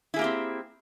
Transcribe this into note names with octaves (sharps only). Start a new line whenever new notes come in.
A#3 C4 E4 G4 G#4